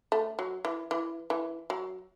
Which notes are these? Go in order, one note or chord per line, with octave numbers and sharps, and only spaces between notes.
A3
F#3
E3
E3
E3
F#3